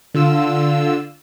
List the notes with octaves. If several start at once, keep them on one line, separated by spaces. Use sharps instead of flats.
D3 F4 E6